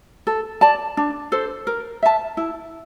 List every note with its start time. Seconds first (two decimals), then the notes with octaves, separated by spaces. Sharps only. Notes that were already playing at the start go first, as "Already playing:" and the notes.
0.27 A4
0.61 D5 A5
0.97 D4
1.32 A4 C5
1.67 A#4
2.03 E5 A5
2.37 E4